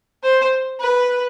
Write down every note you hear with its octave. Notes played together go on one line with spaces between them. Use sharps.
C5
B4